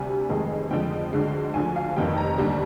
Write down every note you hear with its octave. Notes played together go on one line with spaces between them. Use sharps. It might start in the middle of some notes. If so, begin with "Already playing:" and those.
Already playing: D2 C3 G3 G#5
F1 F2 D#3 G#3
F2 D3 F3 G#3 G5
D2 D3 G#3
D2 D3 F3 G#5
F5
F1 F2 D#3 G3 G5
A#5
D#2 D3 G3